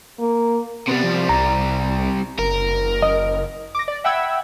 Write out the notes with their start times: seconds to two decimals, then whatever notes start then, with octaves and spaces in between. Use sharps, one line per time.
0.19 A#3
0.88 C3 G3 B3
1.03 F3
1.29 C2 A#5
2.39 F#1 A#4
3.02 D#5
3.75 D6 A#6
3.88 D5
4.04 E5 F#5 G5 B5 E6 G#6